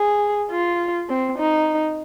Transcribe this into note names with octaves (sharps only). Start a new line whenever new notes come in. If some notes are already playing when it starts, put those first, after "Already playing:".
Already playing: G#4
F4
C4
D#4